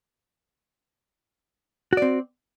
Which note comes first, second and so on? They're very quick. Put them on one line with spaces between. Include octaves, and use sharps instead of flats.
F#4 D5 C4